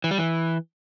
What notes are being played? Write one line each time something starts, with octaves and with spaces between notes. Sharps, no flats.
E3
G3
E3